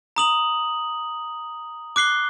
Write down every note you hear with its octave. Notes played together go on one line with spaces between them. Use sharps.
A#5 D#6 F#7
D6 F#6 C7 G7